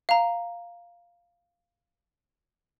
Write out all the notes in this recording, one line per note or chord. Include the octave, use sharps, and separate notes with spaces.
F5 A#5